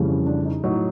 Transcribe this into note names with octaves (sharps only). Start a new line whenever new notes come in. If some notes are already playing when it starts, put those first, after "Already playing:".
Already playing: F2 C#3 E3 G3
C#4
D4
D#4
A2 F#3 D#4